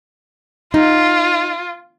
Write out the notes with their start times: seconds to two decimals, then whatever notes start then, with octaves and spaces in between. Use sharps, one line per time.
0.74 D#4 F4